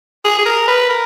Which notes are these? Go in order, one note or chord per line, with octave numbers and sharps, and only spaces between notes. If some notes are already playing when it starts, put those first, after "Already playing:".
G#4
G#4
A#4
B4
A#4